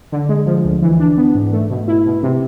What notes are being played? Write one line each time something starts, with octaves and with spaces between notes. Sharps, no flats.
D3
G#3
F3
D2
E3
D4
B3
G#2
A3
B2
E4
B2
C3